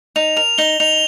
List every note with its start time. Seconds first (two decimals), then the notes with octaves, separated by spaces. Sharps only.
0.16 D#4 F7
0.37 A#4 F7
0.58 D#4 G7
0.80 D#4 F7